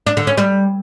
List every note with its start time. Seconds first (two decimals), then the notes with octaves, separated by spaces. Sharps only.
0.07 D4
0.17 D3
0.27 C#4
0.37 G3